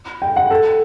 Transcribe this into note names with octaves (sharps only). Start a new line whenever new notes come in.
G5
F#5
A4